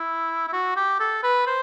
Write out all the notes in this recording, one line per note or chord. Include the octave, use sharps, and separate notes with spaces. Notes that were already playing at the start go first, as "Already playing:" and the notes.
Already playing: E4
E4
F#4
G4
A4
B4
C5